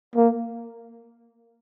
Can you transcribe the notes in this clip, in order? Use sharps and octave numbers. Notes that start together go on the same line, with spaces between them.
A#3